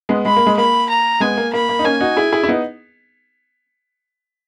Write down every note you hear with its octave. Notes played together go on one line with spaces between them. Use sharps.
G#3 B3
G#3 B5
A#3
G#3
A#3 B5
A#5
G#3 B3 G#5
A#3
A#3 B5
A#3
D#4
A#3 C#4 G#5
D#4 F#4
E4 G#4
E4 G#4
E4
B3 D#4